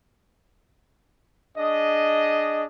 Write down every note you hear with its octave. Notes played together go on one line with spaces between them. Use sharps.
D4 G#4 D#5